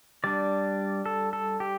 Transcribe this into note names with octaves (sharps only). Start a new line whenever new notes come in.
G3 D4 D5
A4
A4
G4